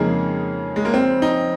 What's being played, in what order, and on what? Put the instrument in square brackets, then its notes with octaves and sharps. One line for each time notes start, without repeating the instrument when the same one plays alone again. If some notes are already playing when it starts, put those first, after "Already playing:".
Already playing: [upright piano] F2 C#3 G#3 D#4 G#4 [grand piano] A#3
[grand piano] G#3
A#3
C4
D#4